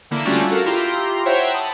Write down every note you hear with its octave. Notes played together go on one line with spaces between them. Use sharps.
D3 A#3 E4
G3 A3 C#4 D4 F4 F#4
F#4 A4 A#4 F5
E4 F4 G4 A#5 C6
C5 C#5 E5 F#5 G5 A#5
A5 B5 D#6